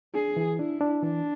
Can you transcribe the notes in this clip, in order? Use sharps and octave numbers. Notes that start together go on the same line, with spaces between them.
D4 G#4
E3
D4 E4
D4
E3 D4